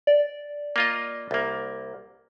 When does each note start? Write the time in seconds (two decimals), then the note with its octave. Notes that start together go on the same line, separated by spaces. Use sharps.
0.07 D5
0.76 A#3 F4 D#5
1.31 C2 A#3